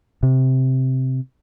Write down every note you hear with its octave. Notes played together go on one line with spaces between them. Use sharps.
C3